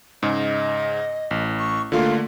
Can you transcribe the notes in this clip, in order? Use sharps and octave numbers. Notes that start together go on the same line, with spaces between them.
G#2 C#3 D#5
A1
C#6
D3 A3 A#3 F4